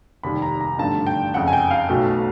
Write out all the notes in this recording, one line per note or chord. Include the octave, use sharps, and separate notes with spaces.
F1 D#2 D#3 G3 B5
A#5
A#5
G#1 G2 D3 F3 A3 A5
G5
F#1 F2 C#3 F#5
G#5
G5
F5
B1 B2 F#3 A3